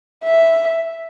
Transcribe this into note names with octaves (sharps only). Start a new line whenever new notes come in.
E5